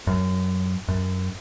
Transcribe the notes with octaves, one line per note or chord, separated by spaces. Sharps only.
F#2
F#2